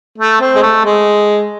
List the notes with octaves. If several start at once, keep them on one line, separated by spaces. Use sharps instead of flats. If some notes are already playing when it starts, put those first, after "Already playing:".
A3
C4
G#3
A3
G#3